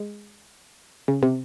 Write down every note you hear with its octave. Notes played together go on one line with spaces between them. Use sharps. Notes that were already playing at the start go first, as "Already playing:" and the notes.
Already playing: G#3
C#3
C3